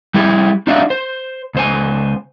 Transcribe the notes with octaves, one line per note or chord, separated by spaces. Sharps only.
G3 E4 G4 G#4
D4 D#4 F#4 D5 E5 F5
C5
C#2 C5 G#5